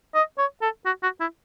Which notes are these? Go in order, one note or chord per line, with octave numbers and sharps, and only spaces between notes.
D#5
C#5
A4
F#4
F#4
E4